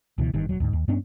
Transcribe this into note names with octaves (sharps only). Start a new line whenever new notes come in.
C#2 B2 E3
G1 G2 D#3
D#1 F#3
D2 G#2
D#2
G2 B3 C#4 D4